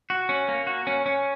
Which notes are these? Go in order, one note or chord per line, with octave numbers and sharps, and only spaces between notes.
F#4
C#4
A#3
F#4
C#4
C#4